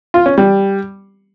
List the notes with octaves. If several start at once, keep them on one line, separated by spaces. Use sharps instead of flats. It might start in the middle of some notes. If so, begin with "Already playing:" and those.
F4
C#4
G3